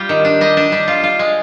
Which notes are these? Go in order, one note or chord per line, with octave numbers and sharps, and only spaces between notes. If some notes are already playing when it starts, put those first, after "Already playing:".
Already playing: G3 F4 G5
D#3
D4
G3 D#5
D4
G3
F4
F4
G#3